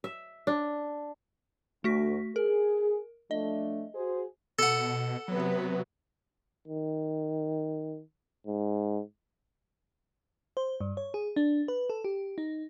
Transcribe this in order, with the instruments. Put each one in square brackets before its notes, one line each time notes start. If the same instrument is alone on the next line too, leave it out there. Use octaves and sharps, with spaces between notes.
[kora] E5
D4
[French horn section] D2 [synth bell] A3 F#4 B6
[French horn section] G#4 [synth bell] A#4
[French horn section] F3 A3 D4 [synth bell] D#5
[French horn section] F#4 G#4 C5
[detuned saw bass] B2 [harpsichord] A4 F#5
[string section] C3 B3 B4 [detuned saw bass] F#3
[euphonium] D#3
G#2
[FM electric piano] C5
G2
C#5
G#4
D4
B4
A4
G4
D#4